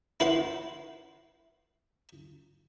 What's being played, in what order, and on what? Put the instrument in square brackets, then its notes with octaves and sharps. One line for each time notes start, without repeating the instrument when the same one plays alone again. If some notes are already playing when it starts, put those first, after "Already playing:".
[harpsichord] E4 B4 F#5 C6